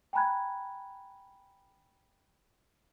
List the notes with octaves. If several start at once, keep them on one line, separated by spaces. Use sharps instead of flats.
G5 G#5 A#5 B5 F#6 G#6